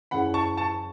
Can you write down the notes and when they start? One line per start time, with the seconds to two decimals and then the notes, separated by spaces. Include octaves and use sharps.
0.11 F#1 F#2 C#3 E3 C#4 F#5 B5
0.34 A5 C#6
0.57 A5 C#6